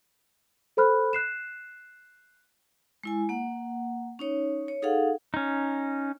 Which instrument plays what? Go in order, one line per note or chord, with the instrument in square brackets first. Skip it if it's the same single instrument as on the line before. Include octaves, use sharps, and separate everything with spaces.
[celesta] A4 C5 B5 F6 F#6
F#6 C7 E7
[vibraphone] G#3 E4 G#5
A#3 F#5
C#4 D#4 C#5
C#5
D#4 G#4 A4 F5 F#5
[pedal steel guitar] C#4 D#4